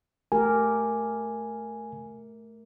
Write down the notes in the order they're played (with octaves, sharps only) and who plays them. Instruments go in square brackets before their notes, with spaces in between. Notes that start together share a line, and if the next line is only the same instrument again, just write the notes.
[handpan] A3 G4 A#4 [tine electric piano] G#5